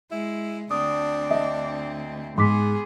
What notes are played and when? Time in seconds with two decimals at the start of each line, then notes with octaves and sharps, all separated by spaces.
0.11 G#3 E4
0.71 D2 C4 D4 D#6
1.31 D#5 E5
2.38 G#2 B3 G#4 C6 D6 B6